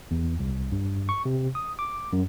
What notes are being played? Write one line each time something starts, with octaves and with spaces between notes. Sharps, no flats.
E2
C2
G2
C#6
C3
D#6
D6
F#2